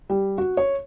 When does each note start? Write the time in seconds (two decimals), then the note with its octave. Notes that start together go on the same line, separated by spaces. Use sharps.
0.10 G3
0.38 F#4
0.57 C#5